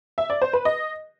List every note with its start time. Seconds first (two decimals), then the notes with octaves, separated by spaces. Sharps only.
0.18 E5
0.30 D5
0.42 C5
0.53 B4
0.65 D#5